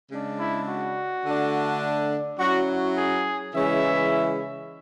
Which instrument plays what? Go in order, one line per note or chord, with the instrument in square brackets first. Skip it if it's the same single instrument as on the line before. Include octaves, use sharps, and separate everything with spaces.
[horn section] C#3 G#3 D4
E4
F#4
D3 A3 D4
F#3 C#4 E4 F#4
F#4
G#4
C#3 E3 G#3 C#4 E4 E5